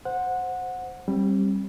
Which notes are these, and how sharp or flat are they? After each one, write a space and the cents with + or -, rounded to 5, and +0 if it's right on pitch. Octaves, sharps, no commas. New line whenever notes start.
C5 +0 F#5 -15
G3 +0 C4 +40